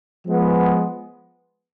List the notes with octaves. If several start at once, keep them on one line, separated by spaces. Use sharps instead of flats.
F3 G#3 B3